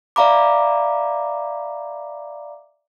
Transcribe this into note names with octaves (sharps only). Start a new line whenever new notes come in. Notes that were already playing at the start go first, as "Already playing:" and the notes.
D5 E5 F5 A#5 B5 D6